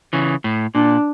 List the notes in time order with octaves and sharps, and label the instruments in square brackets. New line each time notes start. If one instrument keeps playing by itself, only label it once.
[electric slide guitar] C#3 E3
A2
[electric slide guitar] A#2 [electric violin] D4